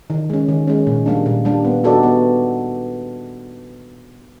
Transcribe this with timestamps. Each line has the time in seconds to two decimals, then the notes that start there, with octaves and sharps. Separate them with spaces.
0.10 D#3
0.30 G#3 C#4
0.49 D#3
0.67 G#3 C#4
0.87 A#2
1.06 G3 A#3 D4
1.26 A#2
1.45 G3 A#3 D4
1.65 B3
1.84 D#4 F#4 A4 D5
2.03 B3